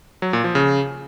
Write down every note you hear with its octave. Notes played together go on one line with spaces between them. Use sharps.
F#3
A#2
F3
C#3